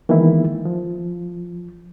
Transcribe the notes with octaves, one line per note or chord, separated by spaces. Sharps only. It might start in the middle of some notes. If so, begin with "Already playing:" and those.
D#3 E3 G#3 A#3 B3 E4
F3